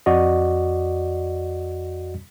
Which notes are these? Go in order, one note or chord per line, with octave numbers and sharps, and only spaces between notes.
F2 F#4 D5 D#5